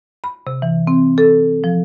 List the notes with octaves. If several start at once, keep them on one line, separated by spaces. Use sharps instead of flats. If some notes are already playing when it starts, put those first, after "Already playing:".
B5
C3
E3
C4
A4
F3